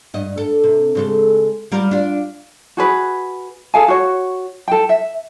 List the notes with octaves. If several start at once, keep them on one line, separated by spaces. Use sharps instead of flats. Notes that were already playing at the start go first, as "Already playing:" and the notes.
G2 D#5
A4
C3
C#3 G#3 A4
G3 F4 A#4
D4 F4
F#4 G#4 B4
G#4 A4 F5 G#5
F#4 C#5
A4 G5
E5